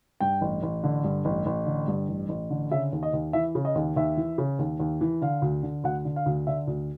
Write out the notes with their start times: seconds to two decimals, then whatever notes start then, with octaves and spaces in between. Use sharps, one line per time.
0.20 G2 G5
0.41 A1
0.63 A1
0.84 D3
1.04 G2
1.25 A1
1.46 A1
1.66 D3
1.88 G2
2.08 A1
2.29 A1
2.50 D3
2.71 C#3 E5
2.93 D#2
3.03 D#5
3.13 D#2
3.33 E3 E5
3.55 C#3
3.65 D#5
3.75 D#2
3.96 D#2 E5
4.17 E3
4.38 C#3
4.59 D#2
4.80 D#2
5.01 E3
5.22 D3 F5
5.42 D2
5.63 D3
5.84 D2 F#5
6.05 D3
6.16 F5
6.26 D2
6.47 D3 E5
6.67 D2